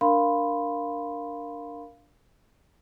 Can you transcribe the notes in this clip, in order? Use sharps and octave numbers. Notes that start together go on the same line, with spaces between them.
D4 A#4 F5 B5 C6